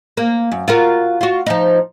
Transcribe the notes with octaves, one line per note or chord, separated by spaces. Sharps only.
A#3
F#2
F4 F#4 A#4
F4 F#4
F3 D#4